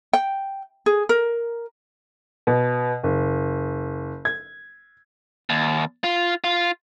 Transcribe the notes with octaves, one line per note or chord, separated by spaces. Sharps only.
G5
G#4
A#4
B2
F#1
G#6
D#2
F4
F4